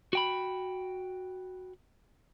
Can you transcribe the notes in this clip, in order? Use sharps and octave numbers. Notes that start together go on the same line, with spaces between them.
F#4 G5 B5